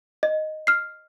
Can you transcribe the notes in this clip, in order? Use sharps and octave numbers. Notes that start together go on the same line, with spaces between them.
D#5
F6 C7